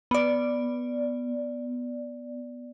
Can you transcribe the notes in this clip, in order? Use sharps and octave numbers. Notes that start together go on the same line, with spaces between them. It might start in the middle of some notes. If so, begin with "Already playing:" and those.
B3 D5